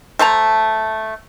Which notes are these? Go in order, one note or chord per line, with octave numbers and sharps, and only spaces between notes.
A3 C5 A5 A#5